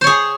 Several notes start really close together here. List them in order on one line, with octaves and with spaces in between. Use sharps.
C5 C#5 G#4